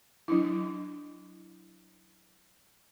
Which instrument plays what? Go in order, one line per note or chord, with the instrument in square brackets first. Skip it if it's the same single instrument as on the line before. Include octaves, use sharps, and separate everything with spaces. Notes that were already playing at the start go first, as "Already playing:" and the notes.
[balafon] F#3 D4 E4